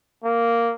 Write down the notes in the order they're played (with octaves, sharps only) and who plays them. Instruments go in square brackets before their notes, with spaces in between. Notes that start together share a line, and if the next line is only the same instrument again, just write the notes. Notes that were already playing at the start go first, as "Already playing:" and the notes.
[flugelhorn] A#3